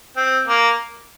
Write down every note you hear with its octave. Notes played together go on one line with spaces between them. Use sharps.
C4
A#3